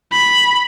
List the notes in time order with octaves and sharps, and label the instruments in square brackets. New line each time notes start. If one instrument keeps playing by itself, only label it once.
[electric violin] B5